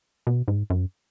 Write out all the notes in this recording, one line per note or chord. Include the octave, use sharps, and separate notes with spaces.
B2
G#2
F#2